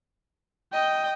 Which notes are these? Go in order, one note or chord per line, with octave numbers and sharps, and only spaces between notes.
D#5 G5